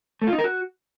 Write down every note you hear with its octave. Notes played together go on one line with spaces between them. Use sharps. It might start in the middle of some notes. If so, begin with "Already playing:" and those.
A3
F4
D#4
A#4
F#4